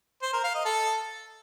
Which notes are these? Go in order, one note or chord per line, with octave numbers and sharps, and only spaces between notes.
C5
A#4
F5
D#5
A4